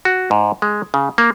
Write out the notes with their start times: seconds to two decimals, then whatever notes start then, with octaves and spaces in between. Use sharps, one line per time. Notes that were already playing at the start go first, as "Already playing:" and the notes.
0.05 F#4
0.31 G#2
0.62 G#3
0.94 C#3
1.18 A#3